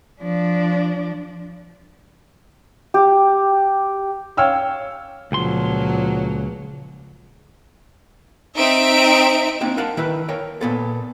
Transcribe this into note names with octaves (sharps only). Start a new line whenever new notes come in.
F3 D4
G4
C#5 F5 G5 E6 F6
C#2 A#2 F3 F#3 C6
C4 D#4 E5 D7
A#3 C4 D4 D#4
A#4 F5 F#5 A5 A#5
D#3 E4 B4
A#4 C#5 G5
A#2 B3 A4